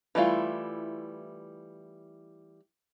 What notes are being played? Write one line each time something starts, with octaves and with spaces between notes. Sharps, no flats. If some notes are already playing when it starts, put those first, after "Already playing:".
E3 G3 A3 E4 F4